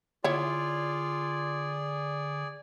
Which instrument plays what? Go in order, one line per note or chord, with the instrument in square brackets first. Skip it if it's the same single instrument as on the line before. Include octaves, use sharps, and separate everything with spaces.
[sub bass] D3 [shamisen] E4 C#5 [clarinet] F4 [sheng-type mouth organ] G#4 D5